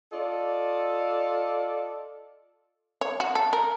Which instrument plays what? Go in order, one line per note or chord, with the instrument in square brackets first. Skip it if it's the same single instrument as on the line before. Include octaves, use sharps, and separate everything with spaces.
[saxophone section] F4 A4 D5 D#5
[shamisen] C#5
F#4
A4
A#4